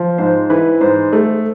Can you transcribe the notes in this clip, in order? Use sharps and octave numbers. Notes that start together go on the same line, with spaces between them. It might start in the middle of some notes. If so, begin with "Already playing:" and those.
Already playing: F3
G#2 C5
E3 B4
G#2 C5
A3